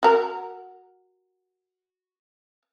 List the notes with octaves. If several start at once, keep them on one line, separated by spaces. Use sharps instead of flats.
F#4 A#4